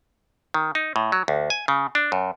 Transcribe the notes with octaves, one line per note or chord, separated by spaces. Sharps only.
D#3
D#4
A2
F#3
D2
G#5
C#3
D4
F#2